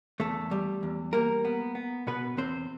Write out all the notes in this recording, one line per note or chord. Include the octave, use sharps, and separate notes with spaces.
E2 A3 A4
G3
E2
G3 A#3 A#4
B3
B3
B2 B3 B4
E2 C4 C5